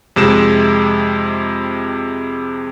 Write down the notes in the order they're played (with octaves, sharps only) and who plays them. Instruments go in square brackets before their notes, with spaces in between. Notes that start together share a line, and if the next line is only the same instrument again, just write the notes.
[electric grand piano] F2 C3 G#3 E7